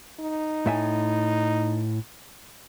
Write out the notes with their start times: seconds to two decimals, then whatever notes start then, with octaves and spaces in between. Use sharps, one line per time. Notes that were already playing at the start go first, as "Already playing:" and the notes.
0.20 D#4
0.66 A2 E5 G#5